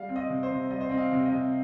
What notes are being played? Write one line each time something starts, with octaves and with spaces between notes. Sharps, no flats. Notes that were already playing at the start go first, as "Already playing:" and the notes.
Already playing: G3 F5
C4
D#5
C3
C5
C3
G3 D#5
C5
C4 D#5
F5
C3
D#5
C3